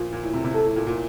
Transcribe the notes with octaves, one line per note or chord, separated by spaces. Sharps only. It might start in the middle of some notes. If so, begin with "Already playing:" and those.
Already playing: A#2 F3
A#2
A2
C3
C3
A4
A2
A#2
A#2